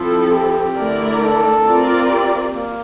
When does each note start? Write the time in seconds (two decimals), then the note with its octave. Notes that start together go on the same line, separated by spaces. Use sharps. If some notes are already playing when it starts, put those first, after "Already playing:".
Already playing: F3 C4 E4 A4
0.31 G4
0.76 D3 A3 E4 A#4 D5
1.20 A4
1.65 C4 F4 A#4 D5
2.09 G4
2.53 A#3